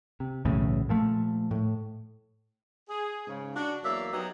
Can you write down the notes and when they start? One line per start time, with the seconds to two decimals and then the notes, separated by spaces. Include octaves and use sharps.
0.20 C3
0.45 B1 E2 A2 C#3
0.89 A#2 F3 A3
1.51 A2
2.89 G#4
3.26 G#2 C#3
3.55 D4 F#4
3.83 E2 F#3 A#3 D5 E5
4.12 F#3 B3 D#4 G4